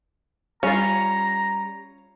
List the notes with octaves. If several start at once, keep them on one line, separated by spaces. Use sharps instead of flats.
G3 C#4 F4 A#5